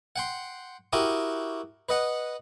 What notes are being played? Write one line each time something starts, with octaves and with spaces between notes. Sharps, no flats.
F#5 G5 C6
E4 F#4 G4 A#4 G5 D#6
B4 D#5 F#5